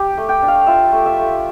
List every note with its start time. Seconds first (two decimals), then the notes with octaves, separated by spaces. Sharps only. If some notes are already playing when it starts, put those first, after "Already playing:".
Already playing: G4
0.17 A3
0.29 G5
0.42 D4
0.48 F5
0.67 F4 E5
0.92 A3
1.06 E5
1.19 A3